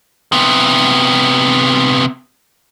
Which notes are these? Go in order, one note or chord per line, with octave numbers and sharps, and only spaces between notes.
C3 B3